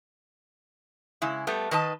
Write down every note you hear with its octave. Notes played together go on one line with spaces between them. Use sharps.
C#3 G#3 E4
G3 A3 B3
D#3 B4 D#5 A5